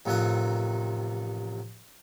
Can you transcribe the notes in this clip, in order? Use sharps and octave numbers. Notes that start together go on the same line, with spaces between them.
A1 C3 D#3 F3 F#5